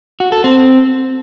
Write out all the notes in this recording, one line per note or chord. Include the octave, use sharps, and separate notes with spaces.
F#4
A4
C4